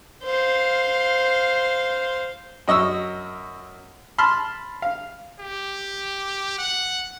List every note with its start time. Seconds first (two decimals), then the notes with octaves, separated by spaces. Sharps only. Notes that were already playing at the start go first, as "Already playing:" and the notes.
0.24 C5 F5
2.68 F#2 D#5 C#6 E6
4.18 A5 B5 C6 F6
4.82 F5
5.40 G4
6.59 F#5